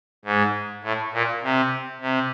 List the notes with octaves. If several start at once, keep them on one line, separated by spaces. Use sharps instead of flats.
G#2
A2
A#2
C3
C3